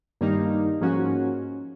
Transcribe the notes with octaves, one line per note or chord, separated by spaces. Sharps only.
G2 D#3 G3 A#3 D#4
G#2 F3 A#3 C#4 F#4